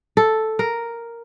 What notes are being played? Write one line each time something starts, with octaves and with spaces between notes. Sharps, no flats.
A4
A#4